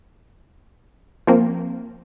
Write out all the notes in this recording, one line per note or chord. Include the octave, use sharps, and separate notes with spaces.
F3 A#3 C4